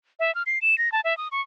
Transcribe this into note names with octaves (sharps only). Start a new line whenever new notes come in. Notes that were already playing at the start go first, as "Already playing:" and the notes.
E5
F6
C7
E7
A#6
A5
E5
D#6
C#6